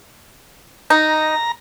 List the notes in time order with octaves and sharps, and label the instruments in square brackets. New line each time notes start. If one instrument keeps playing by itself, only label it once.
[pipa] D#4 [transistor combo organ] A#5